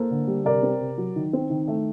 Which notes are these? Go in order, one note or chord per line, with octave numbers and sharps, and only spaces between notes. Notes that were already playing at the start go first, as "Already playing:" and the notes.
Already playing: A#3 A4 C5
D3
G3
C3 A#4 D5
C4
C3
F#3
D#3
C4
D#3
A3